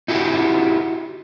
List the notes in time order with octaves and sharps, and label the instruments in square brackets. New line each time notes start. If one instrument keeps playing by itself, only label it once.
[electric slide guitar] D#4 E4 F#4 G4